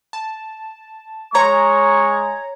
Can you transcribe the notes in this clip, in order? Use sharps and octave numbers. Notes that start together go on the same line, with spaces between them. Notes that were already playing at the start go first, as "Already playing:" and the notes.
A5
G#3 C#5 A#5 C#6 G#6